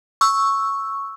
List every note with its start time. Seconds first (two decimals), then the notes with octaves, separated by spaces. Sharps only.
0.21 C#6 E6